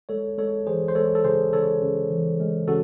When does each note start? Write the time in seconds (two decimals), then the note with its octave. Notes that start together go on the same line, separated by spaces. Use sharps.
0.09 G#3 A4 C#5
0.38 G#3 A4 C#5
0.67 E3 G#4 C5
0.88 C5
0.95 G#3 A4 C#5
1.15 A4
1.24 C#3 G#4 C5
1.53 C#3 A4 C#5
1.82 C#3
2.10 E3
2.40 G#3
2.68 C#3 F#4 A4